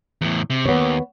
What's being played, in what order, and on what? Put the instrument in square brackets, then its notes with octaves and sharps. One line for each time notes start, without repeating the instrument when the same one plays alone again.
[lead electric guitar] E2 A2
C3
[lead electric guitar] D#2 [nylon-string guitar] B3 C#5